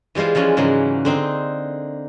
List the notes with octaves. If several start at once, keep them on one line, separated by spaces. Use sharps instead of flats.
E3 G3 G#3 F4 C5
E3 F3 G#3 C#4
G#2 C#3 E3 F#3 A#3 C#4
D3 C4 D#4